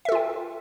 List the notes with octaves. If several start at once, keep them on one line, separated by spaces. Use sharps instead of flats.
F4 A4 E5 G5